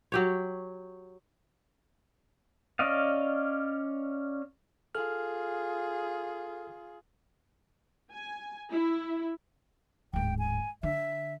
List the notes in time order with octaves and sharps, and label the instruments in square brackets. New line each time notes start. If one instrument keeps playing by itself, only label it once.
[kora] F#3 G4 C#5
[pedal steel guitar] C#4 D5 D#5 F5
[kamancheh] F4 G#4 [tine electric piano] A4 F6
[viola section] G#5
E4
[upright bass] D1 G#2 [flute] G5
[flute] G#5
[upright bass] D3 [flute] E5